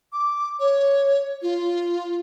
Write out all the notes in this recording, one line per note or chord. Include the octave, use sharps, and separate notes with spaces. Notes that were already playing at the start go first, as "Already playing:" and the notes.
D6
C#5
F4